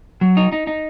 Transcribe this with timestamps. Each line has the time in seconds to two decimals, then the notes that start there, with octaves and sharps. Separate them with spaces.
0.21 F#3
0.37 D#4
0.52 D#4
0.67 D#4